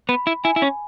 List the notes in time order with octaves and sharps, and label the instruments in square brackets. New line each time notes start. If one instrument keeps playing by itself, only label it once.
[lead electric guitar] B3 [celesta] B5
[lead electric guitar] E4
[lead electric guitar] E4 [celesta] G#5
[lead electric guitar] E4
C#4